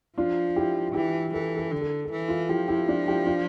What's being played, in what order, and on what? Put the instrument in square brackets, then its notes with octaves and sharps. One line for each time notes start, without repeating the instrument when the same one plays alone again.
[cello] F3 [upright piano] D4 F4
[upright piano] E4 G4
[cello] E3 [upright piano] E4 G4
[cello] E3 [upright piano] A4
[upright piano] A4
[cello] D3
[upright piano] A4
A4
[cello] E3
[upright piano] F4 A4
[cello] F3 [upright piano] E4 G4
[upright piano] E4 G4
D4 F4
E4 G4
D4 F4